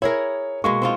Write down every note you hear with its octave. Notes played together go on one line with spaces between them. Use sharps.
E4 G#4 A#4 C#5
B2 G#3 A#3 C#6
C4 D#4 F4